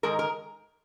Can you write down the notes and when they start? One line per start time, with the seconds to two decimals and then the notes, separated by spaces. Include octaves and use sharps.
0.03 G#2 D#3 G#3 A#4
0.19 A#4